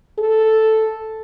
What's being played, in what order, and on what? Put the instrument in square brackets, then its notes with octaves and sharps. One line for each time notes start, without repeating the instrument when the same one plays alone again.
[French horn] A4